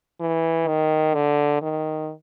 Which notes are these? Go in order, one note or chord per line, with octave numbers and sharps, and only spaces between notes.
E3
D#3
D3
D#3